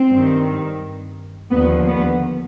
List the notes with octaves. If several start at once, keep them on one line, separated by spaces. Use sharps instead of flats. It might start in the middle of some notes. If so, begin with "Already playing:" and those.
Already playing: C4
G2 D#3
D#2 D3 F3 B3
B3